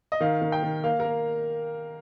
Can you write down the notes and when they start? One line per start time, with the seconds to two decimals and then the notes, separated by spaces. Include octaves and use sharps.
0.12 D#5
0.20 D#3 F5
0.42 D#3
0.52 G5
0.63 D#3
0.84 A#3 F5
1.00 A#3 A#4